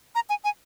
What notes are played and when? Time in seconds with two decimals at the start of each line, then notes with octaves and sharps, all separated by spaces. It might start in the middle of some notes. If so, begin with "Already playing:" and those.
0.15 A#5
0.30 G#5
0.44 G#5